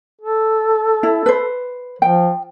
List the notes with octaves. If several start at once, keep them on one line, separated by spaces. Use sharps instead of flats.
A4
E4
B4 C5
F3 G5